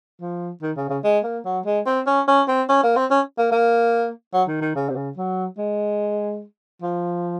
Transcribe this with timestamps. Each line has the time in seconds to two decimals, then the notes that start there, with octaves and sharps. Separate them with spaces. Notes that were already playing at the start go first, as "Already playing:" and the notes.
0.21 F3
0.62 D#3
0.77 C#3
0.89 C#3
1.04 G#3
1.24 A#3
1.45 F#3
1.66 G#3
1.86 C4
2.07 C#4
2.28 C#4
2.48 C4
2.69 C#4
2.83 A#3
2.96 C4
3.11 C#4
3.38 A#3
3.52 A#3
4.34 F#3
4.48 D#3
4.61 D#3
4.75 C#3
4.89 C3
4.96 C#3
5.17 F#3
5.58 G#3
6.82 F3